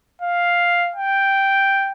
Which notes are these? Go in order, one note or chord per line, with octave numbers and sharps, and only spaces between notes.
F5
G5